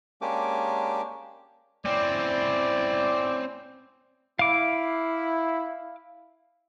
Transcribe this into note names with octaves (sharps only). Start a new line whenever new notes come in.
G#3 A#3 C#4 D4 G4 D6
C4 C#4 E4 D5
E4 F5 D6